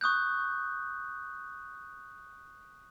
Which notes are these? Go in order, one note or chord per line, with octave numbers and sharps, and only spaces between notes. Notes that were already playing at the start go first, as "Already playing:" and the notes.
C#6 D#6 F#6 G6